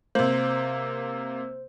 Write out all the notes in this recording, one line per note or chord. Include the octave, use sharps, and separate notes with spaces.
C3 A#3 C5